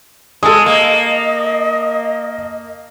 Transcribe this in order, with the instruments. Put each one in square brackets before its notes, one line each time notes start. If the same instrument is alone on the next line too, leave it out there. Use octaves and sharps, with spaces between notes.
[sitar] G#3 [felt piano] A4 D#6
[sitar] A#3 [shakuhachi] D#5